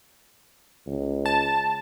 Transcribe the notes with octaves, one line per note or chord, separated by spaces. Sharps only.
C#2
A5